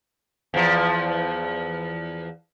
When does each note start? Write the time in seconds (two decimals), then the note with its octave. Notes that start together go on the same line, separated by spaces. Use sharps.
0.54 E2 F3